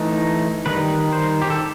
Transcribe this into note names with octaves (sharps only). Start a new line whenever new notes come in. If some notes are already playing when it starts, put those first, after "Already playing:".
Already playing: E3 A3 D#4
D#3 G3 D#4 B4
C5
G4
A4